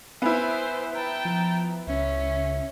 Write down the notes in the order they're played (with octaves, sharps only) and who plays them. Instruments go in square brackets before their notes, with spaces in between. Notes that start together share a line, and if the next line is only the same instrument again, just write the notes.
[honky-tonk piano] B3 E4 [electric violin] B4 C5 [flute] G#5
[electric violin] G5 A5 [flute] A#5
[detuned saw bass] F3
[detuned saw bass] C#2 [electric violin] C#4 [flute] E5